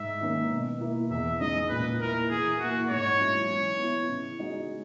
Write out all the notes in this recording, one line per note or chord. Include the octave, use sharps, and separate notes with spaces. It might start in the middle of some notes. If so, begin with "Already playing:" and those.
Already playing: G#2 E5
D#3 A#3 C#4
B2
A#3 E4
E2 E5
C#3 G#3 D#4 D#5
A#2 B4
A#3 E4 A#4
E3 G#4
A#3 E4 F#4
G#2 C#5
F#3 C#4 E4
E3
B3 E4
C#3
G#3 D#4 F#4